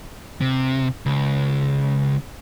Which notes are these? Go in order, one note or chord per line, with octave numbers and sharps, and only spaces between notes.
C3
C#2